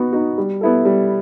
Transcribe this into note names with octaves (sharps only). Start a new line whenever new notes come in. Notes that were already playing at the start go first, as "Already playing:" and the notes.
Already playing: B3 D#4 F#4
D#4 F#4
G3
B3 E4 A4
G3